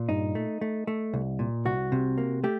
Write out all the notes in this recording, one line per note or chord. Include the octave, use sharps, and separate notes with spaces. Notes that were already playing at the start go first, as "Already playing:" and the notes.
Already playing: A#2
G2 D#4
A3
A3
A3
C2
A#2
C2 F#4
C3
A#3
A3 G4